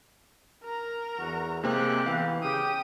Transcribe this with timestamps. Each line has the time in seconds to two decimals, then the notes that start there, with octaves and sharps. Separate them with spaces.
0.63 A#4 A#5
1.18 E2 F#4
1.64 C3 G#3 A#3 C4 G4 F#6
2.06 E3 B3 F5
2.42 C#3 G4 G5 D#6